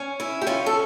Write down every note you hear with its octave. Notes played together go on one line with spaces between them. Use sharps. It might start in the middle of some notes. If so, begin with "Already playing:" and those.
Already playing: C#4
E4
G4
C#4 F4
A4